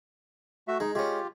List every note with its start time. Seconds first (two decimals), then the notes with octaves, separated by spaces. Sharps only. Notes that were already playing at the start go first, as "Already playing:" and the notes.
0.68 A3 F#4 E5
0.80 G#3 D#4
0.95 G#3 C#4 F4 G4